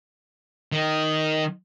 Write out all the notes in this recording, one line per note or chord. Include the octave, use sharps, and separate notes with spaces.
D#3